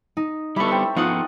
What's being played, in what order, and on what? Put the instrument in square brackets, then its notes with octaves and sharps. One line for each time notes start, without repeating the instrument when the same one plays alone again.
[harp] D#4
[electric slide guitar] G3 B3 [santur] E4 A4 [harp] B5 C#6
[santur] C4 E6
[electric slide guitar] F3 B3 [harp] D#4 F#5 D#6 [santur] F4